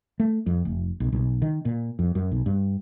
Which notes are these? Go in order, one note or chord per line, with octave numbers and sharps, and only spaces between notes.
A3
F2
F1
B1
B1
D#3
A#2
F2
F#2
B1
G2